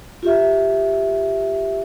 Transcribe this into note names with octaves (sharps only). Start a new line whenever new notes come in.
F4 G4 E5